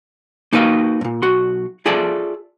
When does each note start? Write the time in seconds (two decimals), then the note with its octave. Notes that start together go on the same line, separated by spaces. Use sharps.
0.53 A#3 D#4 F#4 B4 F5
1.01 G2 A#2
1.22 B1 F#4 C6
1.86 F4 G#4 A4 D5 E5